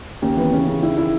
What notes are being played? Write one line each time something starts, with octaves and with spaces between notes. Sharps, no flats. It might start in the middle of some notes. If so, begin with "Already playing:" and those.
D#2 C#4
E3 B3
C#3 C#4
C#3
D#3 E4
E4